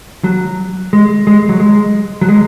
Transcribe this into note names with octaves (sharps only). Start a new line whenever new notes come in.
F#3
G#3
G#3
F#3
G#3
F#3
G#3